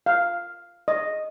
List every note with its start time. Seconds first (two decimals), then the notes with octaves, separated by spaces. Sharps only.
0.06 F5
0.88 D#5